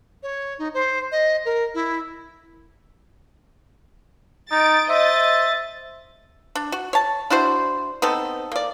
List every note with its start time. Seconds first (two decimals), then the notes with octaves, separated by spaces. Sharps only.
0.23 C#5
0.59 D#4
0.74 C5
1.11 D#5
1.45 A#4
1.74 E4
4.51 D#4 A6 D7
4.89 C5 D#5 E5 A6
6.55 D4
6.72 F#4
6.93 C#5 A5
7.30 D4 E4 F#4 C5
8.02 B3 C4 D#4 A4
8.52 A#3 D5